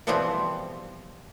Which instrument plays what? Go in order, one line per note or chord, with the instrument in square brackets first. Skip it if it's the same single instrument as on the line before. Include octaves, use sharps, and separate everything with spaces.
[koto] B2 E3 F3 G3 B3 C4